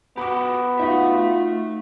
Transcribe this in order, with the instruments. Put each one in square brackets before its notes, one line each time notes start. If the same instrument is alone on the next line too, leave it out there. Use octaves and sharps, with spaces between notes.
[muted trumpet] B3 [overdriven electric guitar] F#4 G4 [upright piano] B5 D6
[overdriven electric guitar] A3 E5 [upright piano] D#4 F#4 [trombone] F4